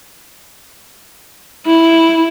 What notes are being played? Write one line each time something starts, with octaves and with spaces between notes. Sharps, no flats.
E4